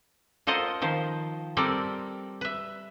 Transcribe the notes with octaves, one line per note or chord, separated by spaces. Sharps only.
F4 A4 A#4 C5 D#5 F#5
D#3 F3 C5
G3 C4 A4 A#4 D5
B4 E5